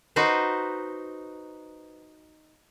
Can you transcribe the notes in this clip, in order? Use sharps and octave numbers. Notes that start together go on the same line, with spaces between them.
D#4 F#4 B4 C5